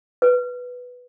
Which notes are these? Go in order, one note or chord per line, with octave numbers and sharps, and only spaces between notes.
B4